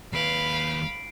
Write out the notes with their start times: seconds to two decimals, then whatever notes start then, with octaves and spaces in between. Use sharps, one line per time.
0.13 D#2 B4 F5 B5 C7 D7